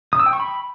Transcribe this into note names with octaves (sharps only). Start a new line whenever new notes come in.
D#6
E6
G5
C#6
B5